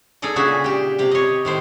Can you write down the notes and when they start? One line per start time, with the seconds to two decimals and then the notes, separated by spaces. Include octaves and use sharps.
0.22 D#4 G#4 A4 D5 D#5
0.36 A#2 C#3 D4 F#4 G#4 E5
0.64 G4 G5
0.98 C3 G4 G5
1.11 C#5 D#5
1.45 A2 D#3 C5